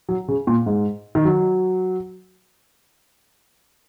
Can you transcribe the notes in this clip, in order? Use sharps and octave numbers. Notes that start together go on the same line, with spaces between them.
F#3
C#3
A#2
G#2
D#3
F#3